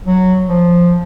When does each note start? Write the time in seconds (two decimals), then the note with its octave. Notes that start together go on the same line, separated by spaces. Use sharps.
0.06 F#3
0.47 F3